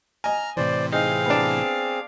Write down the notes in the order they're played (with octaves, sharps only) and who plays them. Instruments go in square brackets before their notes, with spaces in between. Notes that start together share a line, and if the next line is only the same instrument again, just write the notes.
[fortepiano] D#5 G#5 [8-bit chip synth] A#5 F6
[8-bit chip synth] A2 C3 E3 [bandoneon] C5 D5
[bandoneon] C4 G#4 [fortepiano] D#4 [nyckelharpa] F5
[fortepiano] B3 D4